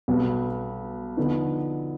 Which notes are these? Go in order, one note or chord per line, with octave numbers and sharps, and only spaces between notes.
B1 B2 G3 B3
D3 F3 B3 D#4